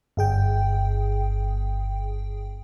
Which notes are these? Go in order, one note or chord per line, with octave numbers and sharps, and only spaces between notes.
G1 G#4 G5